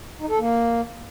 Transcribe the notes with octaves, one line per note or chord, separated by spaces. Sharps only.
D#4
A4
A#3